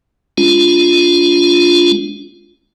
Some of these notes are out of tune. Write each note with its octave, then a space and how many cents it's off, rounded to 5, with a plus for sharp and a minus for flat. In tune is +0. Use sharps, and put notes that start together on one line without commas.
G#3 +0 D4 -30 F4 +0